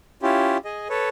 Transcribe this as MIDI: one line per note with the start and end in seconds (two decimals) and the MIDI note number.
0.23 0.57 61
0.23 0.57 64
0.23 0.57 65
0.23 0.57 67
0.65 0.88 68
0.65 0.88 75
0.89 1.09 69
0.89 1.09 71
0.89 1.09 73